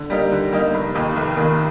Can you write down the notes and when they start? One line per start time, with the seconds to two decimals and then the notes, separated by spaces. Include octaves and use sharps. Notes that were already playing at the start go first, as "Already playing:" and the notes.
Already playing: D3
0.10 G3 A#3 D#4 G4
0.32 D3
0.52 G3 A#3 D#4 G4
0.74 F1
0.94 D#2 D#3 A#3
1.16 F1
1.36 D#2 D#3 A#3